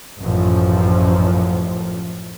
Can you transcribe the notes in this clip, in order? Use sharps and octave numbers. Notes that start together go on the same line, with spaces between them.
A1 F#2 F3